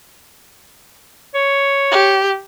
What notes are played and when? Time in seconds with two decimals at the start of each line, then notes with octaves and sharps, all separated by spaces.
1.35 C#5
1.91 G4